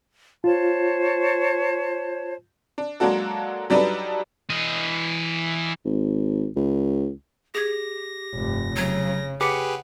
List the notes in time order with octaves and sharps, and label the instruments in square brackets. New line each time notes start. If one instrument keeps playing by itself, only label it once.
[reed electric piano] F4 [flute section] C5 C#5 A5
[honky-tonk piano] D4
F#3 G#3 A#3 D4 F#4 A4
F#3 G3 D4 D#4 A4 B4
[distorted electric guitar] E3 D#5
[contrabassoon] G#1
C#2
[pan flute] G4 [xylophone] G#4 G#6 [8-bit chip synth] A#6
[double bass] F1 G2
[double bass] C#3 [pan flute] F#3
[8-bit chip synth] G4 G#4 B4 [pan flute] F#5 [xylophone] D6 B6 C#7